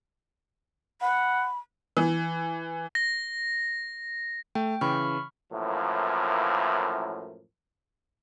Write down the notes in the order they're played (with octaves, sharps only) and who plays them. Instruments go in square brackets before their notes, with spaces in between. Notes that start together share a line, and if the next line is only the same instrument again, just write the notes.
[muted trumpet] F#5 [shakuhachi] B5
[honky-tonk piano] E3
[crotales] A#6
[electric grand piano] A3 [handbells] G5
[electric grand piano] C#3 E3 [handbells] B5 C#6 F6
[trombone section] F#2 A2 E3 F3 A#3